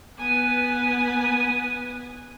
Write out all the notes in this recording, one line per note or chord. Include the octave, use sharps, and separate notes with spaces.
B3 B4 G#5 D#6